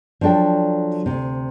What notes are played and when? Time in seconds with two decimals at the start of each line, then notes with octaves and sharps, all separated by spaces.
0.21 F3 F#3 D4 A4 G5
1.06 D2 G2 C3